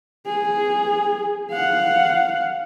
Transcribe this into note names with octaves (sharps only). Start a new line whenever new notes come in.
G#4
F5 F#5